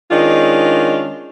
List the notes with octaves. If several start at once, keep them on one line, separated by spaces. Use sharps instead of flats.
D#3 G#3 C#4 D4 F4